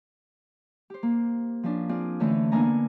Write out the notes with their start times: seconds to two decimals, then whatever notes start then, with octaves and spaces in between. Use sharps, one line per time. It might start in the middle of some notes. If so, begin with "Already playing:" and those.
0.90 G4 C5
1.03 A#3
1.63 F3 C#4 D4
1.89 C4 F4 G#4 D5
2.20 D3 E3 A3 C#4
2.52 A#3 B3 D4 G#5 A#5